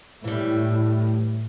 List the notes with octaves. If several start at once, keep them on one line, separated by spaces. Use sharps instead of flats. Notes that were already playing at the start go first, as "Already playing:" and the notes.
A2 E3 G3